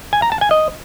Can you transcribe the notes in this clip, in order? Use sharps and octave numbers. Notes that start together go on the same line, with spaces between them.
G#5
A#5
A5
G#5
D#5